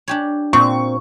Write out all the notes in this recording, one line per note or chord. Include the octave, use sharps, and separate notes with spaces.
D4 G4 C#5
A#2 C4 C#6